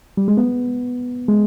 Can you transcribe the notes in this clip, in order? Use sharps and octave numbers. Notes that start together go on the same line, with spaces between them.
G3
G#3
B3
G#3